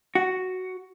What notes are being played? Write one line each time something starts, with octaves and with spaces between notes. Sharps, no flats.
F#4